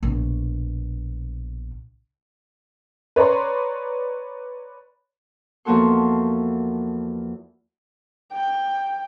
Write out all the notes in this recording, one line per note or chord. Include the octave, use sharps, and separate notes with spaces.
A#1 B2
B4 C#5 D5 A#5 C6
E2 F3 A#3 F#4 A4 C6
G5